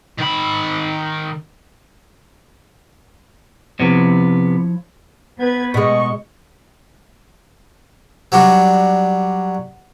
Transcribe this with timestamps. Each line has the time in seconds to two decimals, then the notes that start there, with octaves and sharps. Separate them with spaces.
0.18 D#3 B5
3.80 C3 F3 B3 E4 C#5
5.39 B3 B4 G#6
5.74 B2 G#3 C#6
8.32 F#3 G3 D4 F#4